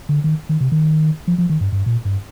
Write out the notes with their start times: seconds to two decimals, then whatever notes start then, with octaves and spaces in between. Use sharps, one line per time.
0.09 D3
0.24 D#3
0.49 D#3
0.61 C3
0.72 D#3
1.27 F3
1.38 F3
1.50 D#3
1.61 G2
1.72 G2
1.86 A#2
2.05 G2